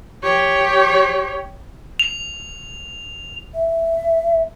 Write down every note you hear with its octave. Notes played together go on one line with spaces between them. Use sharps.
G4 C#5
F7
E5